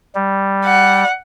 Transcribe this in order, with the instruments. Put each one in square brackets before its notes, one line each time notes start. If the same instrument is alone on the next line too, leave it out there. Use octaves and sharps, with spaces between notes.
[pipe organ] G3
[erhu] F#5